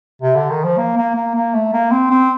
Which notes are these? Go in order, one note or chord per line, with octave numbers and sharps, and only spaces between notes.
C3
D3
D#3
F3
A#3
A#3
A#3
A#3
A3
A#3
C4
C4